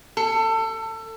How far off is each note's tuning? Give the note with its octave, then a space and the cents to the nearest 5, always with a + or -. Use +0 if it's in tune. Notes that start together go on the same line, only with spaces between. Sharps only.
A4 +25